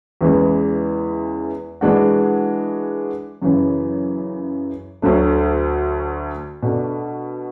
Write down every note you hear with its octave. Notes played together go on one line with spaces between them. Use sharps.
E2 C#3 E3 G#3
E3 G#3 D4 F#4
F#2 C#3 E3
D2 D3 F#3 A3
B2 A3 D4